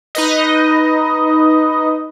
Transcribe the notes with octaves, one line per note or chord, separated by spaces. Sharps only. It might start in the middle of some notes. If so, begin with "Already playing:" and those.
D#4 B4 D#5